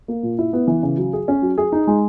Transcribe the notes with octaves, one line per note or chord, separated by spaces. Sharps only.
A#3
A#2
E4
B3
E3
C#3
F#3
G#4
C#4
F#3
G#4
D#4
G#3